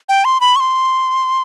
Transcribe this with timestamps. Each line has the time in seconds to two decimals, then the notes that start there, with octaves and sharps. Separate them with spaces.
0.09 G5
0.25 C6
0.41 B5
0.56 C#6
0.60 C6